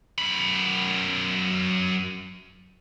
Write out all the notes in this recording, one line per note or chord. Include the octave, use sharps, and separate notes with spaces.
F#2 B5